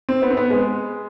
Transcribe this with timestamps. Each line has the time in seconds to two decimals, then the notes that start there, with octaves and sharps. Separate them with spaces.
0.09 C4
0.22 B3
0.30 C4
0.37 B3
0.50 G#3